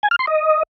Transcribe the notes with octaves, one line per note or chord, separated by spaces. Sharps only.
G#5
F6
C6
D#5